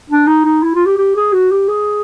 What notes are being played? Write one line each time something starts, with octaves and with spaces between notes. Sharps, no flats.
D4
D#4
D#4
E4
F4
G4
G4
G#4
F#4
G4
G#4